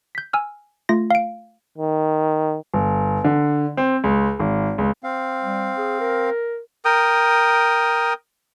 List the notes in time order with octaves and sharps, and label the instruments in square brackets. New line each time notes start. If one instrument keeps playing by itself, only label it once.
[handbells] G6 B6
G#5 E6 F6
A3 F4 A#6
F5 D7
[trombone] D#3
[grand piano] G1
D3
C4
C#2
G#1
C#2
[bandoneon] C4 F5
[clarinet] G3
G#4
A#4
[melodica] A#4 G5 D#6